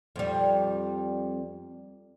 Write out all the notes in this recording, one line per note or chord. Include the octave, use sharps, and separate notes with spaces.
F2 G3